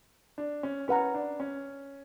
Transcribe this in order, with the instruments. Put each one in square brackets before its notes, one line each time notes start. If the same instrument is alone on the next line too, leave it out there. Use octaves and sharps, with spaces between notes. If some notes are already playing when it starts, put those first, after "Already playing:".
[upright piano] D4
C#4
[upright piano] C#4 [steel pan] B4 F#5 A#5
[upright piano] D4
C#4